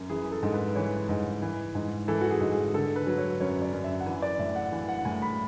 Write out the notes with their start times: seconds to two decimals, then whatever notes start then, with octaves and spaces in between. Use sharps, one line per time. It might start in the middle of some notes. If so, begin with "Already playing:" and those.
Already playing: F#2
0.09 E3 G#4
0.32 A4
0.43 G#2
0.54 B4
0.75 E3 C#5
1.09 G#2
1.42 E3
1.75 G#2
2.08 E3 A4
2.21 F#4
2.30 G#4
2.41 G#2
2.52 G#4
2.74 D3 A4
2.96 B4
3.07 F#3
3.18 C#5
3.40 F#2 C#5
3.62 D5
3.73 F#2
3.84 E5
4.00 F#5
4.06 E3 G#5
4.22 D5
4.39 A2 E5
4.56 F#5
4.72 E3
4.89 F#5
5.05 A2 G#5
5.22 B5